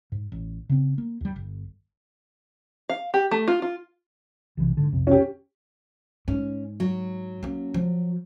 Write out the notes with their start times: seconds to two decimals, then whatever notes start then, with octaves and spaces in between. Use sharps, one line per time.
0.12 G#2
0.32 A1
0.69 C#3 C4
0.98 A#3
1.21 D#2 G3
1.36 G1
2.89 F5
3.14 G4
3.31 A3
3.48 F4
3.62 F4
4.57 B1 C3 E3
4.77 G#2 D3
4.92 B1 F2 C3
5.07 C#4 G4
6.28 G#2 C#4
6.80 F#3
7.43 A#3 C#4
7.74 F3